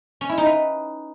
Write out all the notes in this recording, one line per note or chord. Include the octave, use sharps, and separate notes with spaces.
C#4
E4
D#4
B4